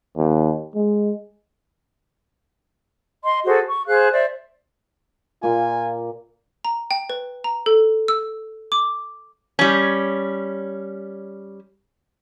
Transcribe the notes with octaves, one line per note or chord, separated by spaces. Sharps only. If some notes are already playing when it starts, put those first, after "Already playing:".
D#2
G#3
D#5 C6
F#4 G#4 A4 C5
C#6
G#4 C5 F5 F#6
C5 D5 E5
A#2 A#3 F4 G#5
A#5
G5
B4
A#5
A4
E6
D6
G3 C#4